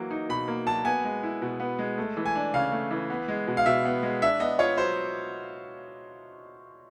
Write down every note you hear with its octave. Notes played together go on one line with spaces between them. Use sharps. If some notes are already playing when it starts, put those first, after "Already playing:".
Already playing: E3 F#3 A#3
D#4
B2 B5
A#3
F#3 A5
B3 G#5
G#3
E4
B2
B3
G#3
A3
E3
G#5
D4
C#3 F5
A3
E3
B3
G#3
B2
F5
B2 E5
B3
G#3
D4 E5
B3 D#5
F4 C#5
F#3 C5